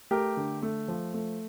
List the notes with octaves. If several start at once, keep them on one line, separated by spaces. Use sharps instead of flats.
A3 G4 A#4
D3
A3
F3
A3